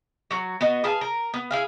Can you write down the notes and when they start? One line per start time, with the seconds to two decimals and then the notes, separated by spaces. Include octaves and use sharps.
0.31 F#3 F#4
0.61 B3 F#4 D#5
0.84 G#4 B4 F5 A5
1.01 A#4
1.34 B3
1.51 E4 G#4 F5